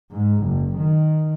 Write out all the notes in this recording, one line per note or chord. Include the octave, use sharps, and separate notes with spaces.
G#2
F#1
D#3